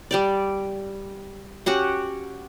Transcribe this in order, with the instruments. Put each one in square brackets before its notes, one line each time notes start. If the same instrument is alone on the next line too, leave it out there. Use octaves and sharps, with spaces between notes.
[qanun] G3 G4 D5
C#4 F#4 G4 F#5